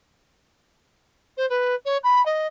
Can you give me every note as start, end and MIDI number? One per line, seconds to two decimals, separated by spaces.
1.37 1.46 72
1.49 1.74 71
1.85 1.97 73
2.03 2.24 83
2.25 2.47 75